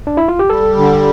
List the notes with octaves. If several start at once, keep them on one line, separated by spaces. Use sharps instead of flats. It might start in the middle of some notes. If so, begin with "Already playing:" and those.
D4
E4
F4
G4
G3 A4
D3